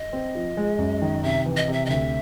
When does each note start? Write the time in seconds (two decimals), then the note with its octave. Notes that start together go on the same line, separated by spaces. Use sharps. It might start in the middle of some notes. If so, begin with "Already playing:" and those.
Already playing: D#5
0.13 C4
0.35 F3
0.57 G#3
0.78 F#2
1.02 D#3
1.23 C3 E5
1.46 E3
1.57 D#5
1.68 C3 E5
1.86 D#5
1.89 D2 E5